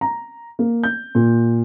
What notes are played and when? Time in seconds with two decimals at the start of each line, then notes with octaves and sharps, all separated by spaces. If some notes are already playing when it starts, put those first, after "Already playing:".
0.01 A#5
0.59 A#3
0.83 G6
1.15 A#2